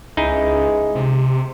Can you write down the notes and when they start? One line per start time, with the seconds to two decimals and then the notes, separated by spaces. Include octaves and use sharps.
0.17 C#2 G#3 D#4 E4 G#4
0.95 C3